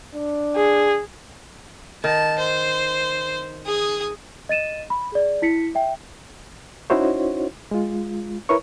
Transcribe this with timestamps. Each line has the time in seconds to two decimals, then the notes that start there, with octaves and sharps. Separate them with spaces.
0.14 D4
0.56 G#4
2.04 D#3 A5
2.39 C5
3.66 G#4 D#6
4.49 D#5 A6 D#7 E7
4.90 B5
5.12 G#4 D5
5.42 E4 B6 C#7
5.75 E5 G5
6.90 C#4 D#4 E4 F#4 C5 C#5
7.71 G#3 F4
8.49 E4 A#4 B4 C#5 C#6